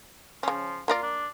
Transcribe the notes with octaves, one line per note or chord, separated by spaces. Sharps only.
C#3 F3 C#4
A#3 F4 A#4 D5
D4